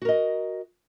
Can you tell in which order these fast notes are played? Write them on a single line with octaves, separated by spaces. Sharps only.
F#4 A#4 D#5